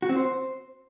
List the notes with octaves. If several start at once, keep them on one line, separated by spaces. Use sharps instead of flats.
F#4
C4
C5